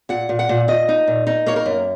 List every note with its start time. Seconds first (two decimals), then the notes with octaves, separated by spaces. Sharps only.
0.09 A#2 F#5
0.29 A#2
0.39 F#5
0.49 A#2
0.68 A#2 D#5
0.89 D#4
1.08 A#2
1.27 D#4
1.46 A#3 C#5
1.56 A#4
1.66 F#2